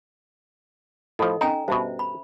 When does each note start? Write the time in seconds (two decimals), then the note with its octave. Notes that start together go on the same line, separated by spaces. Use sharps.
1.19 A2 F3 A4 D#5
1.41 C#4 D#4 G#5 A#5
1.68 G2 B2 C5 E5
1.99 B5